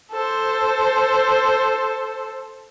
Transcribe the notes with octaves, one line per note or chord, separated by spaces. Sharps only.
A4 C5